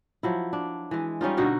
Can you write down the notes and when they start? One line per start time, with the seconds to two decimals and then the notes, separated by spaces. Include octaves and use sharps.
0.23 F3 F#3 E4
0.53 D4
0.91 E3 G#3
1.21 G3 C#4 D#4 F4
1.37 B2 D3 D#4 F#4